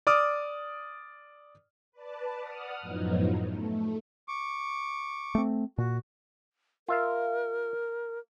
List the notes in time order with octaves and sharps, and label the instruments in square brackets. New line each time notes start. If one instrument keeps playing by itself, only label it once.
[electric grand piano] D5 D6 D#6 F6
[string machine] B4 D5 A5
F#5 D#6 F6
F#2 A2 F3 F#3 B3 D#4
A3
[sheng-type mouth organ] C#6 D6
[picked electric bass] A3 C4
[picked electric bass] A#2 [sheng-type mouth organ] F#4
[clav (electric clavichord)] F4 E5 F5 [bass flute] A#4